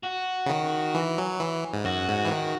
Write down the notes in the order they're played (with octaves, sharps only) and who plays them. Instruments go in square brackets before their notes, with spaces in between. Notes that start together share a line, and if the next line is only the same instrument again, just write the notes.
[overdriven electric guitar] F#4
[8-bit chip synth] C#3
D#3
E3
F#3
E3
G#2
[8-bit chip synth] F#2 [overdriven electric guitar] F#4
[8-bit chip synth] G#2
E3
D#3